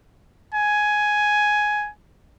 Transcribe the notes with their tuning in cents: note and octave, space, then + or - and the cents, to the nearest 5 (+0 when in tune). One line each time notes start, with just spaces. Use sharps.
G#5 +10